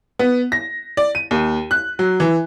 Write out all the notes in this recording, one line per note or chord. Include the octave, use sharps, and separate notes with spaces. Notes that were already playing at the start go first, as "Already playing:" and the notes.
B3
A#6
D5
D#7
D#2
F#6
F#3
E3